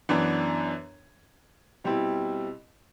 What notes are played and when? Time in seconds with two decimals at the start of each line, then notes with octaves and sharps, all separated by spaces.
0.09 F#2 E3 B3 D4
1.84 B2 G3 C4 E4